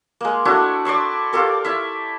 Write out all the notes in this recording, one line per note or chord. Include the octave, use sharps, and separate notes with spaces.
G#3 A#3
A3 D4 E4 F#4
D5 C6 C#6 E6
F4 G4 A4 A#4
E4 E5